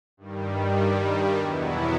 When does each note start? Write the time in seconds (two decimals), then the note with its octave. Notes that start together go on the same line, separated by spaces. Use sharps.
0.17 G2 D#3 G3
1.39 E2 B2 F#3 B3 E4